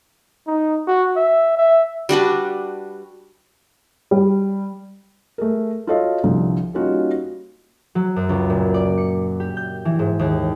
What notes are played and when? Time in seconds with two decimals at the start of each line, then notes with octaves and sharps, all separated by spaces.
0.47 D#4
0.87 F#4
1.17 E5
1.57 E5
2.09 G3 D4 F#4 B4
4.11 G3
5.38 A3 G#4 A#4
5.87 F4 F#4 A4 C#5 D#5 F5
6.23 C2 D3 F3
6.74 G3 A#3 C#4 D#4 F4 F#4
7.95 F#3
8.16 F#2
8.29 C#2
8.50 A#2
8.74 D5
8.98 C#7
9.40 G4
9.57 G6
9.85 E3
9.99 G#2
10.19 D#2